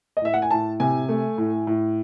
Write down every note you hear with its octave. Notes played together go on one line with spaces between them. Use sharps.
D#5
A2 E5
F#5
G#5
A2 A5
C3 G#5
A3
A2
A2